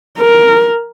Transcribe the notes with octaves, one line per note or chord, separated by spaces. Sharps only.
A#4